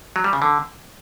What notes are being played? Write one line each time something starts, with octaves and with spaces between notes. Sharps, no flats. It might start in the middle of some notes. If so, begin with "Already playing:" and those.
F#3
G3
C#3
D3